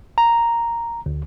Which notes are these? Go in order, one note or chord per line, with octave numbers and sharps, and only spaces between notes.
A#5
D2